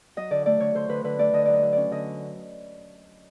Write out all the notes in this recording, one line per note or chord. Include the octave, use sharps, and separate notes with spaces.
F#3 D#5
D3 D5
A3 D5
D3 C#5
D3 C5
D3 B4
D3 B4
A3 D5
D3 D#5
F#3 D5
D#5
F#3
C#4 D5
D3 D#5